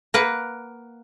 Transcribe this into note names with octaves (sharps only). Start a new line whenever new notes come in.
A#3 B4 F#5